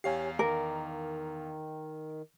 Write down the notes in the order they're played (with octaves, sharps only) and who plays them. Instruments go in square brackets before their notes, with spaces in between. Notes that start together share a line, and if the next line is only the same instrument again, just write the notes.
[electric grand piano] E2 F5 C7 [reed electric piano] G4 C#5 G#5
[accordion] D#3 [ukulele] A#4 [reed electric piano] D6